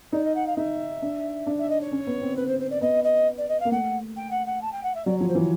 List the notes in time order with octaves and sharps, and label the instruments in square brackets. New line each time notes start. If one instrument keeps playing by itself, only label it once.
[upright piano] D#4 [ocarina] D5
[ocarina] D#5
F#5
F5
[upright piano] D#4 [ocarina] E5
[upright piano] D4
D4
[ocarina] E5
D#5
C#5
[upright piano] C#4
B3
C4
[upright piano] C4 [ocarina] B4
[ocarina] C5
C5
D5
[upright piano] B3 [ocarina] D#5
[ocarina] D#5
D5
D#5
F5
[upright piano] A#3
[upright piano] A3 [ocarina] F#5
[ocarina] G5
F#5
F#5
A5
G5
F#5
E5
[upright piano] F#3 [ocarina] D5
[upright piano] F3 [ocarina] C#5
[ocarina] C5
[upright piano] E3
[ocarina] C#5